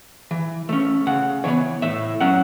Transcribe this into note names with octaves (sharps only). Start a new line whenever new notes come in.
E3
A3 C#4
C#3 F#5
E3 B3 C#5
A2 E5
F#3 C#4 F#5